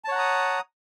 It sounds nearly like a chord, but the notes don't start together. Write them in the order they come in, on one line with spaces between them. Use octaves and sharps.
A5 C#5 F#5 A#5 D#6